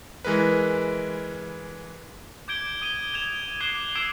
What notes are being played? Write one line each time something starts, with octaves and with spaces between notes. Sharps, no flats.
E3 G#3 A#4 B4
D6 G6 G#6 D7 G7
D#6 D#7 G7
G#6 E7 F7 G7
D6 F#6 G#6 C7 E7 G7
D6 E6 G#6 C7 D7 E7